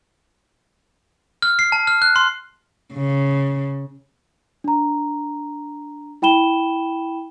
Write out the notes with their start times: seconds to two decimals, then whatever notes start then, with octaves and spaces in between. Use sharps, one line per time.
1.42 F6
1.59 C7
1.72 A5
1.87 F6
2.02 F#6
2.16 C6
2.93 C#3
4.64 D4 A#5
6.22 E4 G5 B5 E7 G7